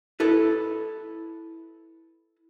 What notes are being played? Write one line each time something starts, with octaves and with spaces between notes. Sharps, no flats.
E4 A4 B4